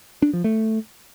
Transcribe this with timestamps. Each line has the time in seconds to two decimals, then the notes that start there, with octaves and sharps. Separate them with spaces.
0.22 D4
0.33 F3
0.44 A3